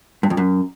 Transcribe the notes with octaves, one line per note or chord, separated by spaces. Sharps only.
G2
F2
F#2